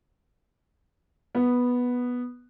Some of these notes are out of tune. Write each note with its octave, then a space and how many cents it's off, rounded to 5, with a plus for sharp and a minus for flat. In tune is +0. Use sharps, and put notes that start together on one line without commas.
B3 -5